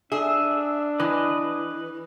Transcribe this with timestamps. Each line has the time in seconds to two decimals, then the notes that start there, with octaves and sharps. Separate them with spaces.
0.12 D4 G#4 E5
1.00 E3 B4 D#5